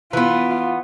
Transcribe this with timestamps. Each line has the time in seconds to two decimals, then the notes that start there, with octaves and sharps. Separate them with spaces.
0.13 E3 B3 F4